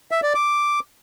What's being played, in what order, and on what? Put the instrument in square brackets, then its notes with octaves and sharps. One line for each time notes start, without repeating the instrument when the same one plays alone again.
[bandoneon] E5
D5
D6